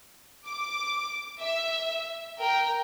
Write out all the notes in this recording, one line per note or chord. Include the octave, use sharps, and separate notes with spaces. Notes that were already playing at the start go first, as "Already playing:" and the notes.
D6
E5
A#4 G5